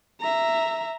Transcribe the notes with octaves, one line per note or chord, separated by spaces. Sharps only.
E5 A#5